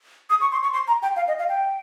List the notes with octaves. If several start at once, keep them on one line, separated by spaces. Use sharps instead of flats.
D#6
C#6
C6
C#6
C6
A#5
G5
F5
D#5
F5
G5